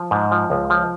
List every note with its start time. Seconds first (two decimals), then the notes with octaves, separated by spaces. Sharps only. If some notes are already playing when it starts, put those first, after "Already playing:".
Already playing: F3
0.11 G#2
0.32 F3
0.50 C#2
0.70 F3